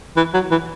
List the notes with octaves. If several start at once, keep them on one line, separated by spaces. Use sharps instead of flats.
E3
F#3
E3